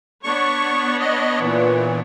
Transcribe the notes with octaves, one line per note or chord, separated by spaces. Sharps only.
B3 D4 C#5 C#6
D#5
A#2 E3